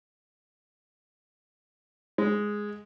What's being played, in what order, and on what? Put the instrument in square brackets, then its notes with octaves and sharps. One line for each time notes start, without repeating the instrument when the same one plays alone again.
[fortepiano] G#3